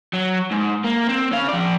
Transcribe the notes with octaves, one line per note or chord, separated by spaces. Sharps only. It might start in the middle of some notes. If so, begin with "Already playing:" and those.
F#3
G#2
A#3
C4
C#4 F5
F3 D5